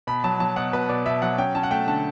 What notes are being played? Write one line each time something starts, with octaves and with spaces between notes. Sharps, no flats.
B2 B5
F#3 A5
F#3 A5
B2 F#5
B2 B4
B2 D5
B2 E5
F#3 F#5
C#4 G5
C#4 A5
F#5
A3 G5
D3 A5